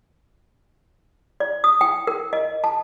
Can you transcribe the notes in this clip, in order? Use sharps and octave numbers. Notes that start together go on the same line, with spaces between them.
D5
D#6
G5
A#4
D#5
A5